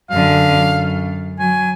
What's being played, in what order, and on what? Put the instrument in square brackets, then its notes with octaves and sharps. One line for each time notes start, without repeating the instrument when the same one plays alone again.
[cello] F#2 D3 [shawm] F5
[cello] F#2
[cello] F#3 [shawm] G#5